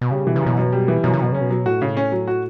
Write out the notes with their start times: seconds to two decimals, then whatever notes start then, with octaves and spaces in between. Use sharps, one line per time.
0.01 B2
0.11 C#3 G3
0.26 B2 E3
0.36 C#3
0.42 F#2 B2
0.58 F#2
0.72 G3
0.88 E3
1.04 F#2 B2
1.14 C#3
1.19 F#2 B2
1.32 C#3 C#4
1.41 B2
1.51 F#3
1.66 A2 F#4
1.82 C#3
1.97 C#4
2.12 F#3
2.28 F#4